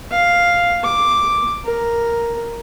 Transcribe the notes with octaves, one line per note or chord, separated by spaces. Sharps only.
F5
D6
A#4